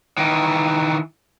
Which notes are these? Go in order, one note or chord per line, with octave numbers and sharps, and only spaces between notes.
D#3 E3